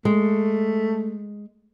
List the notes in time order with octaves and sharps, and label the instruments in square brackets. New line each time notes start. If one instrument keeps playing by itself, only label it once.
[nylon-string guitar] G#3 [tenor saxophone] A3